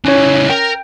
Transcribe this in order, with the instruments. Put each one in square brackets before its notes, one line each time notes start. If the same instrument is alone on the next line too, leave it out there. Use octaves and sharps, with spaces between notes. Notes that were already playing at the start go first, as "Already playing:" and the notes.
[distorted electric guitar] C#3 E3 [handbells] C#4 C#5
[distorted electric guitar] A#4 [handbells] G5